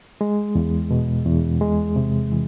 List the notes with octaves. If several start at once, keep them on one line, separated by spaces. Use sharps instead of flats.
G#3
E2
B2
E2
G#3
C3
E3